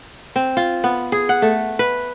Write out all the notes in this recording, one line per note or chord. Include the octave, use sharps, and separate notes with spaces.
C4
F4
B3
G#4
F#5
A3
B4